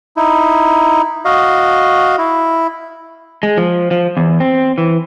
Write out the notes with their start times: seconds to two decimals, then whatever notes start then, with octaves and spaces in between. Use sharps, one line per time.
0.17 D#4 E4
1.25 F#4 D#5 F5
2.18 E4
3.43 G#3
3.57 F3
3.91 F3
4.17 E2
4.40 C4
4.78 E3